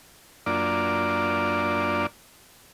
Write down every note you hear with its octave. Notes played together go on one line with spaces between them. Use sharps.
F#2 A#3 D4 F4 D5